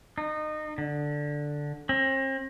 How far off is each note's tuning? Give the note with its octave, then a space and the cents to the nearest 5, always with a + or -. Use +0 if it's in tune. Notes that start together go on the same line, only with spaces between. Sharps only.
D#4 -25
D3 +0
C4 +40